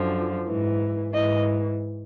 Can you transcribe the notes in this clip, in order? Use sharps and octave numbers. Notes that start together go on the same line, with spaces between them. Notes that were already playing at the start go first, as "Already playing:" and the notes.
Already playing: F#2 D3 F3
G#2 E3
G#2 E3 D#5